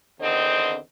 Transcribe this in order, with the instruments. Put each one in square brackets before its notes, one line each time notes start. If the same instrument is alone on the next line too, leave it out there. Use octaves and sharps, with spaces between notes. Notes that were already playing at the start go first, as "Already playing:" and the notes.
[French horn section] E2 D3 D#3 C4 C5 D#5